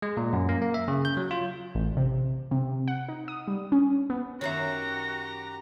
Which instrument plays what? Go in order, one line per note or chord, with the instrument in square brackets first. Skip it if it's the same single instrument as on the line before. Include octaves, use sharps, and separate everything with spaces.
[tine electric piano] G#3
A#2
F#2
A#3
A#3
E5
C#3
G6
F#3
F4
[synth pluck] A1
C3
C3
F#5
D#4
D#6
G3
C#4
B3
[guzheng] F#2 D#3 [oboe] F#4 [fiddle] G4 A#5 [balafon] C#5 E5